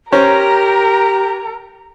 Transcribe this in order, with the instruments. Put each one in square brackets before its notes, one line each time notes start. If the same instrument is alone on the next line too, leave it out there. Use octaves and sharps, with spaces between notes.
[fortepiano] C#4 C5 [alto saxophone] G4 [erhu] A#4 [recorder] A#5